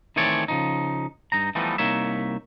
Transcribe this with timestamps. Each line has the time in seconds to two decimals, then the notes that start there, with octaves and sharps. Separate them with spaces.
0.16 D#3 E3 A3 C4 C#5 D5
0.48 C#3 F3 D#4
1.32 G2 D#4 A#5
1.55 E3 F3 G3 A3 B3 D#4
1.78 C2 A#3 D#4 C#5 E5